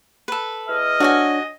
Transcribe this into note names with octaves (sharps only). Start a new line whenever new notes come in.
A4 B4
E2 D#5 E6 F6
D4 F#4 C#5 F#5 G#5